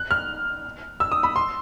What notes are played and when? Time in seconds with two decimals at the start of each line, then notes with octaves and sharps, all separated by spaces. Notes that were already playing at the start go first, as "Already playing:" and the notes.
Already playing: F#6
0.11 F6
1.00 E6
1.12 D#6
1.23 B5
1.36 C6